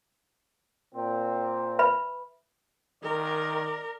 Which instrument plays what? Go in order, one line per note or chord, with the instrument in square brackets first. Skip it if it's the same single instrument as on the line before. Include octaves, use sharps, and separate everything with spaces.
[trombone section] A#2 C4
[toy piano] B4 E5 B5
[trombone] D#3 [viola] A#4 [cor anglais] D5